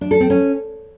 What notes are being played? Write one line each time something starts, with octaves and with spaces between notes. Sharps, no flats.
D4
A4
C4
C#4